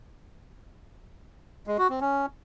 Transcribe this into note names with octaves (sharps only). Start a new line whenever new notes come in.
G#3
F#4
C4
C#4